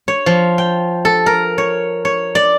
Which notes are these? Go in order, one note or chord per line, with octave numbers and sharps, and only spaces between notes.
C#5
F3
G5
A4
A#4
C#5
C#5
D5